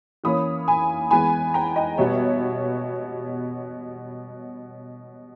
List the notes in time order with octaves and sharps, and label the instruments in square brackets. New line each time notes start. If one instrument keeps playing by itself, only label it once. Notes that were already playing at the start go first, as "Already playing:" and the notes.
[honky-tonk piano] E3 A#3 C#4 B5 D#6
G#5 B5
E3 G#3 B3 G#5 B5
G5 A#5
D#5 G5
B2 G3 B3 C#5 E5